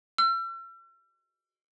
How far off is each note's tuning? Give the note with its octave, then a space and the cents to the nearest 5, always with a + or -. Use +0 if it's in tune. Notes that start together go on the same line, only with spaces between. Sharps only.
E6 +45